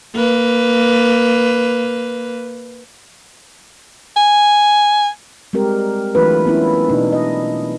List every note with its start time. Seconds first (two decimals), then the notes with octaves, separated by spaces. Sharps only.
0.15 A#3 B4
4.17 G#5
5.53 G3 G#3 C4 G4 A#4
6.15 E3 F#3 A3 D4 F4 B4
6.45 B3 C#4 E4
6.89 B2 D4 D#4
7.12 D#5